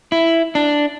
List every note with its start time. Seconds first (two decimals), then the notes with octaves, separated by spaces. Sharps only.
0.12 E4
0.55 D4